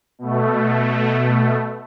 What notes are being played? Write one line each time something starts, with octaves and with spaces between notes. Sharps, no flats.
B2 A3